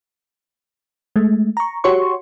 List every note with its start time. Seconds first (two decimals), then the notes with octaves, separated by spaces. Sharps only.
1.16 G#3 A3
1.57 A#5 C#6
1.84 F#4 G4 C#5 C6 C#6